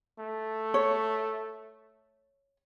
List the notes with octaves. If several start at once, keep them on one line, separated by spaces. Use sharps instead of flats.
A3
C#5